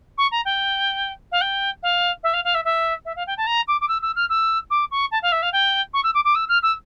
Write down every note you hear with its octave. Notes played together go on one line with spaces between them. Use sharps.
C#6
A#5
G5
F5
G5
F5
E5
F5
F5
E5
E5
E5
F5
G5
A5
A#5
D6
D6
E6
E6
F6
E6
D6
C#6
A5
F5
E5
F5
G5
C#6
E6
D6
D6
E6
F6
E6